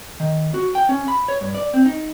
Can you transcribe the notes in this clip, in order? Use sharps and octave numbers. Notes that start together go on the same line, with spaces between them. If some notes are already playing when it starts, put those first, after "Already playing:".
D#3
F#4
G5
C#4
B5
C#5
G2
D5
C4
D#4